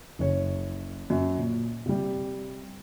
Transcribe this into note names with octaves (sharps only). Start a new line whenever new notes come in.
F#1 C#5
F#2
A#2
C3 G3